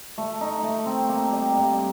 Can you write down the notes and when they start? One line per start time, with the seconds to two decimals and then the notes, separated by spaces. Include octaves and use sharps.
0.18 A3
0.41 D#4
0.63 A3
0.86 C4
1.09 A#3
1.32 G3
1.56 G2